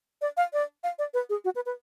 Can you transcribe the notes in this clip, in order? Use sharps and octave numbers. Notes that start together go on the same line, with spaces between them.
D5
F5
D5
F5
D5
B4
G#4
F#4
B4
B4